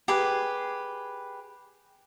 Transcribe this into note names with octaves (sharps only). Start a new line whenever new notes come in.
G4 G#4 B4